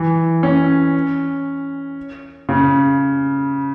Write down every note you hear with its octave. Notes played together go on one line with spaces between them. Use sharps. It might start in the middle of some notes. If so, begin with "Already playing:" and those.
Already playing: E3
C#4
C#3